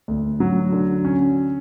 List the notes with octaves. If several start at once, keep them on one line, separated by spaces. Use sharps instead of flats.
D2
F#3
D3
C#4